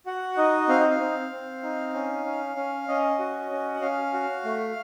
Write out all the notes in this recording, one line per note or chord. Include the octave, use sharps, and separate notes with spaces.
F#4 F#5
D#4 D#5
C4 F5
D#5
F5
C4
C4
D#4
C#4
C#4
C#4
C#4 D#5
F#4
C#4
F#5
C#4 F5
F#4
A3